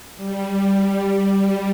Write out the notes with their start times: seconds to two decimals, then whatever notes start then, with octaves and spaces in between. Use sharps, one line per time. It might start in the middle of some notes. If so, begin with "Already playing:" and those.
0.16 G3